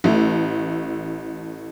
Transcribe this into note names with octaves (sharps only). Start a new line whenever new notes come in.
A1 A3